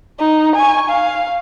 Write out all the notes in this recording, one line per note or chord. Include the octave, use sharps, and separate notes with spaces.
D#4
G#5 C#6
F5